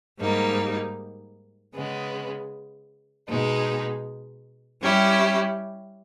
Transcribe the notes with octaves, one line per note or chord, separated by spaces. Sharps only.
G#2 G3 A#3 D#4
C#3 G#3 B3
B2 G#3 D#4
G3 C#4 E4 G4